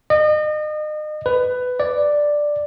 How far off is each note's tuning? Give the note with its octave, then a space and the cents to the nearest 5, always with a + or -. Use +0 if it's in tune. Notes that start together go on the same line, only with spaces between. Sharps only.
D#5 -35
B4 +15
D5 +5